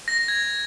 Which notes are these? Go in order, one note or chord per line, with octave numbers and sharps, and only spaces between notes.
A#6
A#6
G#6